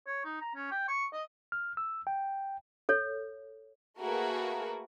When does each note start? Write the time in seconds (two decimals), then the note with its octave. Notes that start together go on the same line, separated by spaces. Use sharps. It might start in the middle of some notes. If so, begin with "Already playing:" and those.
0.07 C#5
0.25 D#4
0.41 A#5
0.55 C#4
0.71 G5
0.88 C#6
1.13 D#5
1.52 F6
1.77 E6
2.07 G5
2.89 A4 C#5
4.00 A3 A#3 F#4 G#4 A#4 B4